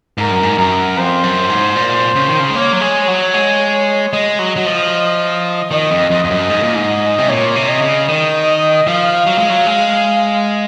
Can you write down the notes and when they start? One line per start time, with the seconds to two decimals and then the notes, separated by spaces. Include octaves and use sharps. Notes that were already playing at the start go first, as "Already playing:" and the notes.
0.18 G#2 A#4
0.31 F#2
0.43 G#2
0.58 F#2 A#4
0.97 F2 C5
1.23 F#2
1.50 G#2
1.76 A#2
2.16 C#3
2.28 D#3
2.40 C#3
2.50 G#3
2.55 A#3 C#5
2.73 F#3
2.81 G#3
3.08 F#3
3.34 G#3
4.13 G#3 D#5
4.39 F#3
4.56 F#3
4.66 F3
5.71 D#3 D#5
5.91 F2
6.10 F2 D#5
6.24 F2
6.30 F#2
6.50 G#2
6.63 A#2
6.76 G#2
7.18 C3
7.29 A#2 C#5
7.56 C3
7.69 D#5
7.82 C#3
8.08 D#3 D#5
8.87 F3 F5
9.27 F#3
9.38 G#3
9.50 F#3
9.66 G#3